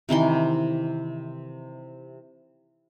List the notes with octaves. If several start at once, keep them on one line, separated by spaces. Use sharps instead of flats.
C3 D#3 E3 C6